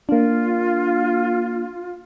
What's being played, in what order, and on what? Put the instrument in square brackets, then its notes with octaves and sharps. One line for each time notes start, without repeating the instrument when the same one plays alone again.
[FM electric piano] A#3 D4 [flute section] F4